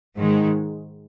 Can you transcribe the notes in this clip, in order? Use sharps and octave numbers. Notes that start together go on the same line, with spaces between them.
G#2 D#3 G#3